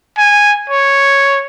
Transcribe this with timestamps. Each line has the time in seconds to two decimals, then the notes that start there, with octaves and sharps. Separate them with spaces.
0.17 G#5
0.69 C#5